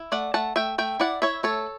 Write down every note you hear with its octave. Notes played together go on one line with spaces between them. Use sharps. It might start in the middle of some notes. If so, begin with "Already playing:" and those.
Already playing: E4
A3 D5 F#5
A3 F#5 A5
A3 E5 G5
A3 E5 G5
E4 D5 F#5
E4 C#5 E5
A3 A4 C#5